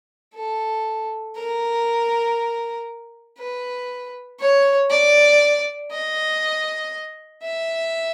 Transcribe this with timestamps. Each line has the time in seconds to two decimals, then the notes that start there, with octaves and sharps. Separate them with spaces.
0.35 A4
1.36 A#4
3.38 B4
4.39 C#5
4.90 D5
5.91 D#5
7.43 E5